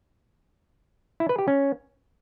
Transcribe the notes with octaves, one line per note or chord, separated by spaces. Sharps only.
E4
B4
G4
C#4